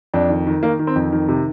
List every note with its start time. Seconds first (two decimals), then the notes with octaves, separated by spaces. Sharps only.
0.14 F2 D4
0.30 D#3
0.47 D#3
0.63 D#3 A#3
0.79 D#3
0.87 C4
0.96 F2
1.12 D#3
1.28 C3